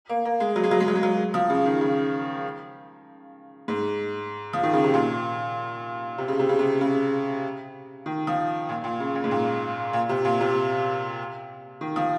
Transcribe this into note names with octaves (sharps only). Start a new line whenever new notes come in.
A#3
A#3
G#3
F#3
G#3
F#3
G#3
F#3
G#3
F#3
F3
C#3
D#3
C#3
G#2
F3
D#3
C#3
C3
A#2
C3
C#3
C3
C#3
C3
C#3
D#3
F3
A#2
A#2
C#3
A#2
G#2
A#2
A#2
C3
A#2
C3
D#3
F3